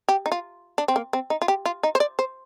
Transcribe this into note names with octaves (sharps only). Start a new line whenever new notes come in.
G4
D#4
F4
D4
C4
A#3
C4
D#4
F4
G4
F4
D#4
C5
D5
C5